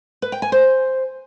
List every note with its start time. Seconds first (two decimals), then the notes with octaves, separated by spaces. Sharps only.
0.22 B4
0.32 G5
0.42 G#5
0.52 C5